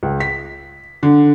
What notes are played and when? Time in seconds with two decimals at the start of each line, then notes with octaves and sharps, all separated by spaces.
0.03 C#2
0.20 B6
1.03 D3